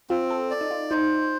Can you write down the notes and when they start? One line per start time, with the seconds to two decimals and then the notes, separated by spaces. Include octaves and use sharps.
0.10 C4 F4
0.30 A4
0.51 D5
0.61 D#4
0.71 F4
0.91 D#4 C5